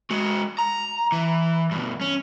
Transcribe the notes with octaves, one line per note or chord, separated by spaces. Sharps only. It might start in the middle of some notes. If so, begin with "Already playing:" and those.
G#3 F#4
A#5
E3
G2 B2
C#4